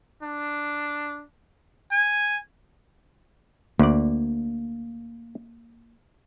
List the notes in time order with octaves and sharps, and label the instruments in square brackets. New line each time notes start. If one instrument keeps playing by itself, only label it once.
[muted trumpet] D4
G#5
[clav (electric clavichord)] D2 D5 [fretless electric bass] A#3